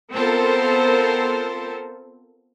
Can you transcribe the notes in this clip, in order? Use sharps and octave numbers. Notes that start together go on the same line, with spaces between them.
B3 C4 F4 A4 A#4 C5